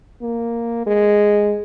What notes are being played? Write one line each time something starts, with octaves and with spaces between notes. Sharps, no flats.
A#3
G#3